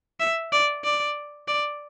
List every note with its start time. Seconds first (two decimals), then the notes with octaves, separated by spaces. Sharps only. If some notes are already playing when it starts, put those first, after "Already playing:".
0.20 E5
0.53 D5
0.84 D5
1.48 D5